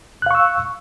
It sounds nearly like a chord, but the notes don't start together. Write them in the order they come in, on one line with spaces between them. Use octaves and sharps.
F#6 F5 C#6 E6